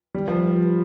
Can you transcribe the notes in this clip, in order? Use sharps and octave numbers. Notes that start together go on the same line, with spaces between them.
G3
F3